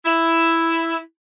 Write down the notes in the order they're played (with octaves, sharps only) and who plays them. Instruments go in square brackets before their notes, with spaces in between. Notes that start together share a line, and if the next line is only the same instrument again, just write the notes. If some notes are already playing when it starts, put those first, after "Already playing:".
[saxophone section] E4